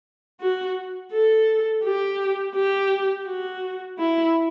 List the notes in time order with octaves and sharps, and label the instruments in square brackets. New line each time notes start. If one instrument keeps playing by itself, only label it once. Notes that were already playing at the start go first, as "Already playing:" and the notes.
[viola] F#4
A4
G4
G4
F#4
E4